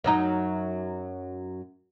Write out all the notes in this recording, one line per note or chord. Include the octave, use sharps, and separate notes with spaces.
F#2 F#3 D#4